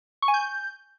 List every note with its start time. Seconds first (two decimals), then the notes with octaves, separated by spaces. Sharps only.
0.22 C#6
0.28 G#5
0.34 G6